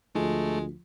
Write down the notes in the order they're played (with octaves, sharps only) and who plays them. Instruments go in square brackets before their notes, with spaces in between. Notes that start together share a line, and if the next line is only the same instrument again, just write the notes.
[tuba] D2 [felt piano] F3 [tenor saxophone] G#3 [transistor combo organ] A3